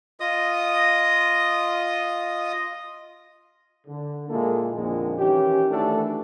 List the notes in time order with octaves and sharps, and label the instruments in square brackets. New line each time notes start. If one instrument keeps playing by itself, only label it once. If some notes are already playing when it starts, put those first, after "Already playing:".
[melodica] F4 D#5 D#6
[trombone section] D3
A#2 G#3 A#3 E4 A4
A#1 F2 A#2 D3 D#3 G#3
D#3 E3 C#4 G4
D#3 E3 A3 D4 F#4 A4